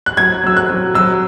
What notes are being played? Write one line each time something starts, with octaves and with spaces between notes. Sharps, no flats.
F#6
F#3 G#6
F#3 E6
F#6
F#3
F#3 E6